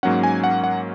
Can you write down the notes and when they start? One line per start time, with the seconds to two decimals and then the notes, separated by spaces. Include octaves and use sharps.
0.03 G#2 F#3 A#3 C#4 F#5
0.23 G#5
0.44 F#5
0.64 F#5